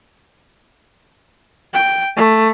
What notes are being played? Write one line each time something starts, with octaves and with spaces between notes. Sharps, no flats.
G5
A3